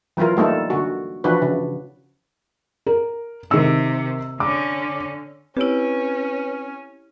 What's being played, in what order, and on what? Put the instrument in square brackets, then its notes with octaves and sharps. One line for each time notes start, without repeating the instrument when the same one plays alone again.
[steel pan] E3 F#3 E4 F4 A#4
G3 A3 A#3 D#4 A4
D3 F#4
E3 F3 D4 E4 F#4 B4
C#3
[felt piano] A#4
[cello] C3 [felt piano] D#3 E6
[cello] D3 C#4 [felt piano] D6
[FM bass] C4 [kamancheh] C#4 [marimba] E4 G4 [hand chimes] B4 C#5 D7